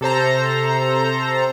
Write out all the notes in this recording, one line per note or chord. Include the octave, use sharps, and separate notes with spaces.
C3 A4 C5 A#5